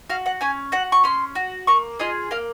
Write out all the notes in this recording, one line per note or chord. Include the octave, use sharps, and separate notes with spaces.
F#4 F5
F#5
C#4 G#5
F#4 F#5
C#6
C#4 C6
F#4
A#3 C#6
F4 G#4 D#5
A#3 F5